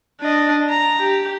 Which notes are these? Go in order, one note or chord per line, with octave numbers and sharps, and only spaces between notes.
D4 D#5
A#5
G4